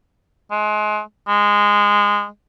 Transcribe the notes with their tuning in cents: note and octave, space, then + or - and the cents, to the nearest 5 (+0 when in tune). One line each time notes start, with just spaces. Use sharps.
G#3 +30
G#3 -15